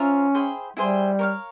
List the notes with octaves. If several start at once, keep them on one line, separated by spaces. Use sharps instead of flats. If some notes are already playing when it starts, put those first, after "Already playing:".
Already playing: C#4 F4 C5 E5 A#5
E4 G#4 C5 G5
G3 E4 G#4 C5 G5
A#4 C#5 F5